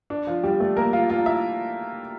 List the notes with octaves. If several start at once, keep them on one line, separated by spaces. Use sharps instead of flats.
D4
F3 F4
G3 G4
A3 A4
A#3 A#4
F4 F5
F4 F5
E4 E5